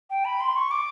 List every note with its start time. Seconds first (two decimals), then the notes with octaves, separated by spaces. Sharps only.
0.10 G5
0.25 B5
0.41 C6
0.56 C#6
0.71 D6